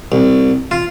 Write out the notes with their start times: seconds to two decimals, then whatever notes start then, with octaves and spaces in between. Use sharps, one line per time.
0.12 C2
0.71 F4